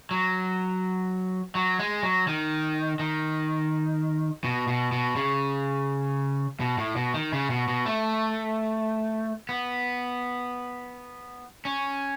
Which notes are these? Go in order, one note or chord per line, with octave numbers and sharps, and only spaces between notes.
F#3
F#3
G#3
F#3
D#3
D#3
B2
B2
B2
C#3
B2
A2
B2
D#3
C#3
B2
B2
A3
B3
C#4